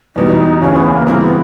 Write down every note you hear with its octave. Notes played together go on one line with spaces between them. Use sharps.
E2 B2 G3 D#4
D2 C#3 E3 C#4
B3
A#3
G2 E3 G#3 A#3 C4 E4
B3